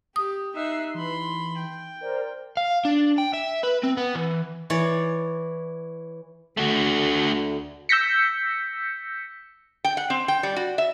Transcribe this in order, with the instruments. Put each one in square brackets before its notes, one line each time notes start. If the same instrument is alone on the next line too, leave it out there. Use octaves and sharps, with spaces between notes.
[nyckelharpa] G4 [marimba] D#6
[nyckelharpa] D#4 E5 [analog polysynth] E6 F#6 C7
[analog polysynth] E3 [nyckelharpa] B5 C6
[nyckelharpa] G5
[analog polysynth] A#4 C5 D5
[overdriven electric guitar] F5
D4
G5
E5
B4
C4
B3
E3
[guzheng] E3 C#5 D5
[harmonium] D2 D3 [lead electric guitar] A3 F#4
[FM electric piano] E6 G6 A#6 B6 C#7
[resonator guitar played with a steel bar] G5
F#5
C4
G5
G3
F#4
E5